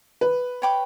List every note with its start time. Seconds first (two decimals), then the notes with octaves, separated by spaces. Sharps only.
0.21 B4
0.62 C#5 G5 B5 D6